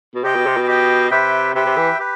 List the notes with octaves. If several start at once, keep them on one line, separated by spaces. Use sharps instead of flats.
B2
C3 G4 D#5 G5
B2
C3
B2
G4 D#5 G5
C3 G4 B4 E5 G5
C3 G4 B4 E5 G5
C3
E3
G4 B4